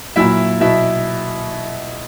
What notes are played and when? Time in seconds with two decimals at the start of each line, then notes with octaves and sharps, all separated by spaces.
0.16 A#2 F#3 E4 E5
0.60 B2 F#3 E4 E5